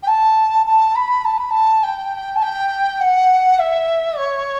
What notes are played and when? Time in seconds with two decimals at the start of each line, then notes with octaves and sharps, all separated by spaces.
0.03 G5
0.07 A5
0.66 A5
0.95 B5
1.25 A5
1.38 B5
1.50 A5
1.83 G5
2.36 A5
2.42 G5
3.00 F#5
3.59 E5
4.18 C#5